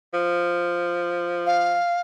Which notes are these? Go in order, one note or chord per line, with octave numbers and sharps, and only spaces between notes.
F3
F5